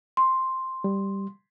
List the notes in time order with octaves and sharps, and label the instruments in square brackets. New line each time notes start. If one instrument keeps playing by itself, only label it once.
[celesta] C6
[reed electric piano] G3